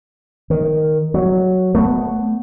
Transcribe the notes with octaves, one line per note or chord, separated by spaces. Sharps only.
D#3
F#3
A3 B3